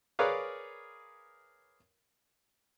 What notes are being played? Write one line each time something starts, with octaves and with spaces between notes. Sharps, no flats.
G#4 A#4 B4 C#5 D5 F5